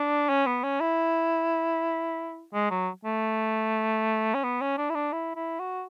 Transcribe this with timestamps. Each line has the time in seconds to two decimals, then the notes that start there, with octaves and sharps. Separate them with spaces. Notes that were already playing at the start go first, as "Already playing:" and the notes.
Already playing: D4
0.29 C#4
0.46 B3
0.63 C#4
0.80 E4
2.53 G#3
2.70 F#3
3.05 A3
4.34 C#4
4.44 B3
4.61 C#4
4.78 D4
4.90 E4
4.95 D4
5.12 E4
5.36 E4
5.59 F#4